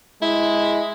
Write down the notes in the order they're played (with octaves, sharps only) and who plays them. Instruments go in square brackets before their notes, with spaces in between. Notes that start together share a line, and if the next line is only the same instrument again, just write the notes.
[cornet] G#3 [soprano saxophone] E4